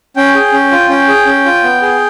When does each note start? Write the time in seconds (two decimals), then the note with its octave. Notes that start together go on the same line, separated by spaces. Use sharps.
0.16 C#4 G5
0.35 G#4
0.52 C#4
0.71 F4
0.89 C#4 G5
1.08 G#4
1.26 C#4
1.45 F4
1.64 B3
1.82 G#4